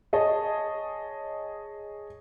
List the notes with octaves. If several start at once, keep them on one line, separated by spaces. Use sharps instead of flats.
G#4 C#5 D#5 A5